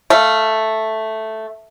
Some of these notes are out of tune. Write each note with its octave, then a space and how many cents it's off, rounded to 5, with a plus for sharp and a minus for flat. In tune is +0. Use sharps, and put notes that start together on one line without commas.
A3 +0 F5 -15